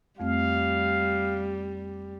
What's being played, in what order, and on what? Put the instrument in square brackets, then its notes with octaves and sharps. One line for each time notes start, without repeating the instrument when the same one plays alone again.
[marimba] F2 A3 C4 [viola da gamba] G3 [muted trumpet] F5